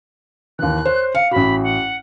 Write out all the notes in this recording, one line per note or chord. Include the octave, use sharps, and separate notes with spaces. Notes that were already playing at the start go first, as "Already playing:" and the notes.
D#2 E3 F#6
C5 C#5
F5 C#7
A1 F#4 B5
F#5